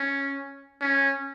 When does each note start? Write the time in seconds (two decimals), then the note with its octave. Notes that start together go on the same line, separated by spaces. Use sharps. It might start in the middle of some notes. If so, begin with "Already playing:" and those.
Already playing: C#4
0.81 C#4